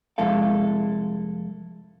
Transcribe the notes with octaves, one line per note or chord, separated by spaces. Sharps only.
C2 F2 G#3 E4 A4 F5